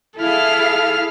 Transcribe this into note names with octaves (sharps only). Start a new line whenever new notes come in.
E4 G#4 A4 F5 F6